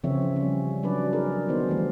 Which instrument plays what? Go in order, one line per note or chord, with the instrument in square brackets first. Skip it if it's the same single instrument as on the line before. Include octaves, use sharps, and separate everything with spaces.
[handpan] C#3 E3 F3 C4 C#5 E5
G3 C#4
F#3 D4 B4 D5
D#4 G#4 A#4
D#3 B3 D#4 C5
D#3 E3 G3 A3